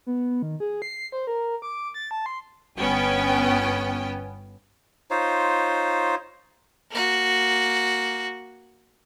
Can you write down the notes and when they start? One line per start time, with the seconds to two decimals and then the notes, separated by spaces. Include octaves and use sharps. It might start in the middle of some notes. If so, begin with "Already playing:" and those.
0.07 B3
0.42 D#3
0.60 G#4
0.82 C7
1.12 C5
1.27 A#4
1.62 D6
1.94 A6
2.11 A5
2.26 C6
2.79 G1 B3 C#4 G5 G#5
5.11 D#4 F4 C5 C#5
6.90 A#3 F#4